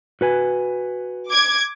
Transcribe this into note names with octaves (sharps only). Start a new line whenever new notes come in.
F#4 B4 G#5
D6 G#6